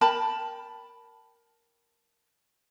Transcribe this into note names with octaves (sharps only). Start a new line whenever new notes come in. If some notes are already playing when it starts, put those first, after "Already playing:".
A#4 G5 A5 B5